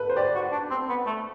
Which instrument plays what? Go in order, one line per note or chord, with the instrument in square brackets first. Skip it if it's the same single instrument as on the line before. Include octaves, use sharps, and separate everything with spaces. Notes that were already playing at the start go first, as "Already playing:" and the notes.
Already playing: [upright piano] A4 B4
C5
[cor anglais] G4 [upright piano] D5
[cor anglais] F#4
D4
C4
B3
A3